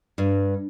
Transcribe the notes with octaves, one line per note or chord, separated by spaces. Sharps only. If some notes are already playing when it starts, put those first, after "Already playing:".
G2